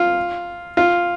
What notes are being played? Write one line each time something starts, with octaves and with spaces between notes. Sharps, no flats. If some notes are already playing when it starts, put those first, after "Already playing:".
Already playing: F4
F4